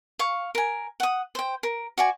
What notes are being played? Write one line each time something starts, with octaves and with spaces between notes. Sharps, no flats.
F5 C#6
A#4 G#5
F#5 D#6
C5 G5
A#4
F#4 D5 G#5